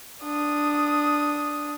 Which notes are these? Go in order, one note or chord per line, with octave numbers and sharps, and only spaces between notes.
D4 D#6